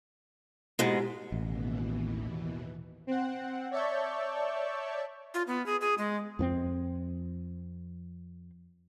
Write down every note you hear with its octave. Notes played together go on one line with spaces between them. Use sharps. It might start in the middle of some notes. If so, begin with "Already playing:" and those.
G#2 B2 G#3 E4 G4
A1 D#2 B2 E3
C4 F#5
C#5 D5 E5 A5 C#6 G6
F4
B3
G#4
G#4
G#3
F2 B3 C4